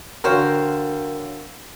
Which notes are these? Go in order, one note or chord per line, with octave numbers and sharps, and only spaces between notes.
D3 F#4 A#4 C5 C#5 F5 G5 C6